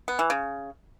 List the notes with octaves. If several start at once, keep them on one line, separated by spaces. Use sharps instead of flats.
B3
E3
C#3